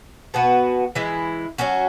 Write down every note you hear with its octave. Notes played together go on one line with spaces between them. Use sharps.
B2 B3 F#4 B4
E3 G#3 E4
F#3 C#4 F#4